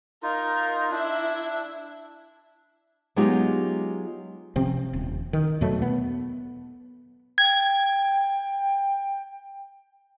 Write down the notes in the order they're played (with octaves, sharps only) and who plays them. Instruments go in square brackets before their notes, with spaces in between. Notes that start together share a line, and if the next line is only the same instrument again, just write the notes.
[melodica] D#4 F4 [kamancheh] A#4
[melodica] D4 [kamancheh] E4 E5
[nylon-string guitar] F#3 G#3 B3 D#4 F4 G4
[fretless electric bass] C3 F3 C4 C#4
D#1
D#3
E2 B2 F#3 A3
B3
[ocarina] G5 [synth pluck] G#6